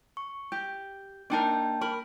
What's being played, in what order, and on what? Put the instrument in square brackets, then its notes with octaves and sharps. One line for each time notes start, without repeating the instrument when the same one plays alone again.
[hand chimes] C#6
[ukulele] G4 [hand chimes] G6
[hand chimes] A#3 G5 A5 [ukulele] D4 D#4 A#4
[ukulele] A#4 B5